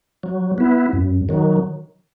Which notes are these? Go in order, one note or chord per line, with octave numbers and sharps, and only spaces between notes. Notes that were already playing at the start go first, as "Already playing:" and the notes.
F#3
B3 E4
F#2
D#3 F#3